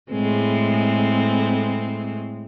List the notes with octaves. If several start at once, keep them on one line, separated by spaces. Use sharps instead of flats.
A2 G#3 C4